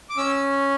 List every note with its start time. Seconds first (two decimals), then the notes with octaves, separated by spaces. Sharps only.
0.10 D6
0.17 C#4 E6